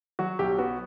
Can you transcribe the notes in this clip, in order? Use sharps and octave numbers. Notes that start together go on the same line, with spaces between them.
F#3 F#4
B1 G4
B3 F#4